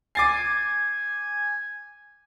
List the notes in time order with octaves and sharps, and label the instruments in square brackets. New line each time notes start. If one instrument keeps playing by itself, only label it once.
[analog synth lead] G#5 [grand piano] D6 A6 C7